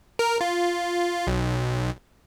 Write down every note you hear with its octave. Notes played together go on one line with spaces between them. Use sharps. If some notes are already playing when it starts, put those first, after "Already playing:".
A#4
F4
B1